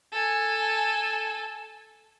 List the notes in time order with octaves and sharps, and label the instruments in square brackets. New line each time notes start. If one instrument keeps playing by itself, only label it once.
[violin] A4 G#5